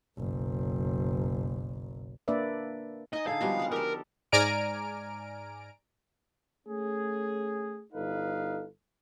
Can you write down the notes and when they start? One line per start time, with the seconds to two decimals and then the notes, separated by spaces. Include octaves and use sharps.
0.18 F#1 B1
2.28 A#3 D4 B4 D5 E5
3.13 D#4 D#5 G#5
3.27 D3 G#4 A4 F5
3.41 F3 G3 G#3 B3 F#4 G#4
3.60 G#4 F#5
3.72 G4 A4 A#4
4.32 G#2 D5 G#5 A#5 F6 D7
6.67 A3 C#4 G#4
7.93 G1 D#4 A4 B4 F5